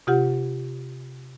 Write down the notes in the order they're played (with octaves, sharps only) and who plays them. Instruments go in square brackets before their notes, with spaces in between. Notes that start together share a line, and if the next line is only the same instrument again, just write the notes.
[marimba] C3 F4 G4 F#5